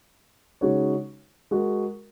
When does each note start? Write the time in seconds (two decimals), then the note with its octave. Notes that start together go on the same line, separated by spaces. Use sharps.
0.61 C#3 G#3 D#4 F#4 C#5
1.51 G#3 F#4 A#4